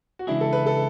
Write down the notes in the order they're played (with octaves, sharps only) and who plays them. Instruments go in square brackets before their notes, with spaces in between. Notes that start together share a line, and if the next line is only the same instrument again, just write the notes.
[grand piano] F#4
[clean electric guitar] C#3 E3 G#3 D4 G#4 [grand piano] E4
[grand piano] A4
B4
A4